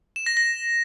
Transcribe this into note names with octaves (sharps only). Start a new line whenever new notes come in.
E7
A#6
A#6